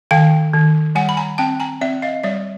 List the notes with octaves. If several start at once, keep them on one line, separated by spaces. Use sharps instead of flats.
D#3 F5 G5
D#3
G3 F#5 G#5
B5
G#5 A#5
C4 G5 A5
G#5 A#5
C4 D5 E5
D#5 F5
G3 D5 E5